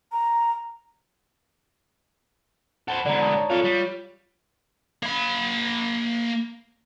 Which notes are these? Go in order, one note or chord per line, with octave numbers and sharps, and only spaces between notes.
A#5
A4 C5 F#5 B5
G#2 D3 D5 A#5
A5 D#6 A6
C#5
F4 A4 C#5 F5
G3
A#3 B5